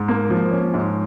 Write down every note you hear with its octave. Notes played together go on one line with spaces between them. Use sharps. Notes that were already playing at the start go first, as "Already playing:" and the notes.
Already playing: G#2
A#3
F3
C#4
G#2